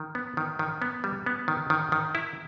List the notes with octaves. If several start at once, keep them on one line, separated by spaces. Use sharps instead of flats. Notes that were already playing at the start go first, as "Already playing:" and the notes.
Already playing: D#3
B3
D#3
D#3
B3
G3
B3
D#3
D#3
D#3
E4